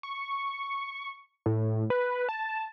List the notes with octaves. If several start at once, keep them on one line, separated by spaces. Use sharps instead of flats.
C#6
A2
B4
A5